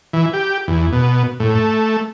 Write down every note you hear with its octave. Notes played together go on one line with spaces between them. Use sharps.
E3
G4
E2
B2
A2
A3